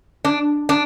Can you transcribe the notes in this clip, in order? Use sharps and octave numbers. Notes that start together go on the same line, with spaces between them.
D4
D4